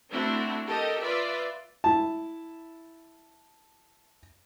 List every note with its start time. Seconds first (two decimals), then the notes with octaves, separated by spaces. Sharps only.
0.12 A3 C4 D4 E4 F#4
0.69 G4 A4 A#4 D#5
1.00 F4 B4 D5 E5
1.84 E4 A5